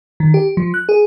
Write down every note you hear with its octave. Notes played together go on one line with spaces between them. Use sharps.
D#3
G4
F3
F#6
G#4